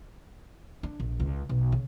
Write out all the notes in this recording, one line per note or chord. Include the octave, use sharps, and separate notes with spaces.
D4
A#1
C#2
B1
C#3